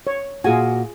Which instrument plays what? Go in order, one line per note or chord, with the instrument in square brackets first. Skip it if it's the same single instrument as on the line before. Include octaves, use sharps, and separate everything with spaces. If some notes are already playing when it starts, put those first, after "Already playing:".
[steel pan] C#5
[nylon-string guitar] A#2 F#4 [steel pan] F4 G#4 G#5